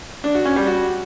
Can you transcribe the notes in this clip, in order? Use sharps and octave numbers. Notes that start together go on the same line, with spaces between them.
D4
F#4
C#4
G3
F#4